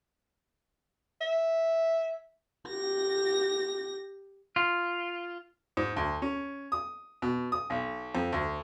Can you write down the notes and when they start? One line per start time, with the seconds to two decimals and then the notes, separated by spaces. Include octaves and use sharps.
1.21 E5
2.67 G4 A#6
4.56 F4
5.77 G#2
5.96 D2
6.22 C#4
6.72 D#6
7.22 B2
7.52 D#6
7.70 B1
8.15 F2
8.32 D2